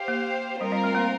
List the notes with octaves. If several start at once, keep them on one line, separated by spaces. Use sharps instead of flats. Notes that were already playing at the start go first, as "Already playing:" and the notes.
Already playing: G4 C5 F5
A#3
G3 C4 F4 A#4
G3
A3
A#3